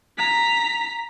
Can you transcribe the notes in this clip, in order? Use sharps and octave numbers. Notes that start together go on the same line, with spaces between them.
A#5 B6